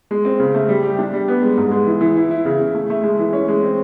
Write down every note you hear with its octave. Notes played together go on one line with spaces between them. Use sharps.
G#3
C4
C#3
A3
G3
G4
D4
G3
B3
G#3
G#2
G#3
E3
E3
E4
E4
C#3
C#3
A3
A3
G#3
E3
C#4
G#3
C4